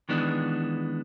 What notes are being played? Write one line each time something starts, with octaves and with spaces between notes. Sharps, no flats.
D#3 E3 G#3 B3 D4